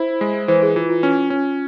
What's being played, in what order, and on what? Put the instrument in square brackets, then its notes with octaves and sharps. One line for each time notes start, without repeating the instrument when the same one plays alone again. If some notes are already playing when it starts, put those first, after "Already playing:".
Already playing: [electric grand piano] E4 [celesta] C5
[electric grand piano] G#3
[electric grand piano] E3 [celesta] C5
[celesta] G#4
[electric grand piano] E3 [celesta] F4
[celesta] F4
[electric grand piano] C#4
C#4